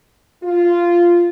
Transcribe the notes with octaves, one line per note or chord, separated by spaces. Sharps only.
F4